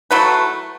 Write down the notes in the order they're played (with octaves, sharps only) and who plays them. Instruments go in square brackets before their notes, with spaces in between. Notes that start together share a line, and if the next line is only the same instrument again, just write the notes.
[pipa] F#3 A3 E4 B4